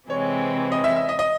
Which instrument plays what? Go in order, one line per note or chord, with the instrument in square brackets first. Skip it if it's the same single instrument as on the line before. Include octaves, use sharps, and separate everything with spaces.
[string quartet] C3 E3 G#3 C4 [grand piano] C#5
[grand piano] D#5
E5
E5
D#5
D#5